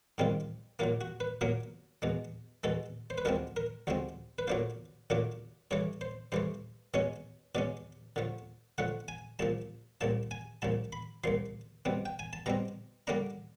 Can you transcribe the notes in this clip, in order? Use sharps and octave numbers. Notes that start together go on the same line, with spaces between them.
G#2 D#3 G3 C4 F4
A#2 F#3 A#3 F4
F#4
B4
A#2 F#3 A#3 A#4
E2 B2 G#3
E2 B2 G#3 A4
C5
B4
D2 D3 F3 G#3 C4 A#4
A#4
D2 D3 F3 G#3 C4
B4
A#2 F#3 A3 D4 F4 C5
A#2 F#3 A3 D4 F4
G2 E3 A3 C#5
C5
G2 E3 A3 C5
B2 G#3 C#4 C#5
B2 G#3 C#4 D5
D3 F3 A3
D3 F3 A3 F#5
G#5
C2 A#2 F3 A5
C2 A#2 F3 A5
G#5
C2 A#2 F3 A5
B5
C2 A#2 F3 C6
B2 G3 C4
G5
G#5
A5
B2 G3 C4 A#5
D3 G3 A#3 D4 A#5